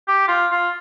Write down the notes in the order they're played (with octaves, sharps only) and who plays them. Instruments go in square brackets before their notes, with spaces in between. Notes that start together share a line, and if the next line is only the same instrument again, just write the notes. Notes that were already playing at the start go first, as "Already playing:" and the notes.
[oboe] G4
F4
F4